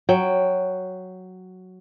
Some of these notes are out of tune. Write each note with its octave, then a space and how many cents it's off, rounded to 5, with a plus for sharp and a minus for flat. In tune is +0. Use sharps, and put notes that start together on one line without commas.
F#3 +0 G5 +0